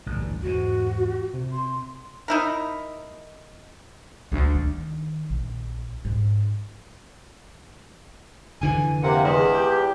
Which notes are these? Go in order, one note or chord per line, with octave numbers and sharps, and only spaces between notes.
A1 D2 G2
E2 G#2 F#4
C3
C6
D#4 E4 A#4
D2
D#3
A#1
G#2 G#3
F1 D3 E3 G#5
C3 A#3 F#5
E2 G#3 E4
G4